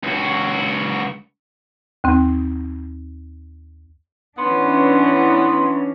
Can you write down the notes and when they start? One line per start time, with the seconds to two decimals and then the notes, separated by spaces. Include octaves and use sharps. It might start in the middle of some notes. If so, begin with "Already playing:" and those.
0.03 C#2 F#4
2.04 D#2 C4
4.38 E3 B3 C#4 D4 C6